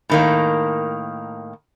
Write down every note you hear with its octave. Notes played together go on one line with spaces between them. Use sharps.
A2 D#3 A#3